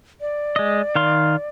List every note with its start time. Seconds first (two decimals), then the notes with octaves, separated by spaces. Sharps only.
0.21 D5
0.56 G#3 D#5
0.95 D#3 F5 C6